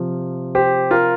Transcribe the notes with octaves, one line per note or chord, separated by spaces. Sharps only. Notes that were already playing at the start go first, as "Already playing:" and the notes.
Already playing: C3 F3
G4 C5
F4 A#4